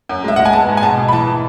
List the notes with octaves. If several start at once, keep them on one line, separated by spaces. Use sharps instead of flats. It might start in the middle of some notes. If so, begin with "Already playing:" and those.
F#2
G#3 E5
G#3 F#5
G#5
B3 A5
G#2
G#5
B2 A5
B2
B5
E3 A5
E3